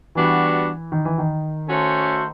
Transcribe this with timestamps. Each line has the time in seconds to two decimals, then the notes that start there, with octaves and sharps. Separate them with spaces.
0.15 E3 G3 B3 D4 F#4
0.92 D#3
1.05 E3
1.18 D#3
1.69 A3 C#4 F#4 A4 C5